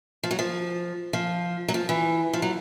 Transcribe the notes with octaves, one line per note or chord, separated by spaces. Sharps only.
F3
F#3
F3
F3
F#3
F3
E3
F3
F#3